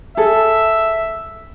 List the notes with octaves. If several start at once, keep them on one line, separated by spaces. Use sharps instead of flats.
G#4 A4 E5